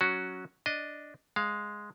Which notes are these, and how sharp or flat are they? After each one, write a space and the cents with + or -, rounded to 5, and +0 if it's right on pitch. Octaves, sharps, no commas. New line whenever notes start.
F#3 +0 C#4 +0 F#4 +0
D4 +0 D#5 -5
G#3 +0 F5 +0